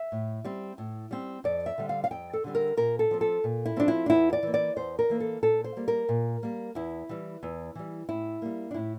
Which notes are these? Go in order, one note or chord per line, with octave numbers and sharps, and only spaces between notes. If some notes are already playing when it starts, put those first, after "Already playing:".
Already playing: E5
A2
G3 C4
A2
G3 C4
F2 D5
E5
D3 G3 C4
F5
F5
F2 G5
A4
D3 G3 C4
A#4
A#2 A#4
A4
F3 C4
A4
A#2
E4
F3 C4 D4
E4
D4
E2 E4
D5
E3 A#3
D5
E2 C5
A#4
E3 A#3
A4
A#2 A4
C5
G3 A#3
A#4
A#2
G3 A#3
E2 E4
E3 G3
E2
E3 G3
A2 E4
G3 A#3
D4
A2 E4